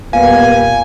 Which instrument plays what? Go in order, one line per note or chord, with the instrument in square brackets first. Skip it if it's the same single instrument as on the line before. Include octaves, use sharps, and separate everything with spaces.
[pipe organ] E2 [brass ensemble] A#2 G3 B3 [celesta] F5 [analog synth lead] G#5